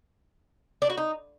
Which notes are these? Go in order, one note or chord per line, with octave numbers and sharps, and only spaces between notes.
D4
F#4
D#4